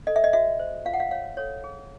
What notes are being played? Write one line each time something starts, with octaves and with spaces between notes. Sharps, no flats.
A4 D#5
E5
D#5
F#4 E5
C5
F4 F5
F#5
F5
C#5 F5
A4 C#5
G#4